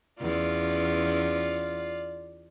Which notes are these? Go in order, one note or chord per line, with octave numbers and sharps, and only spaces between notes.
E2 C#4 F4 D5